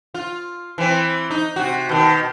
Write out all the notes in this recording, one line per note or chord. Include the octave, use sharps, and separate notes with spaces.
F4
E3 C4
D#4
C3 F#4
B2 D#3